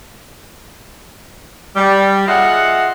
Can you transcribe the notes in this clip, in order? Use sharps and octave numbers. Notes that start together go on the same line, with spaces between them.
G3
F4 G#4 D#5 E5 F#5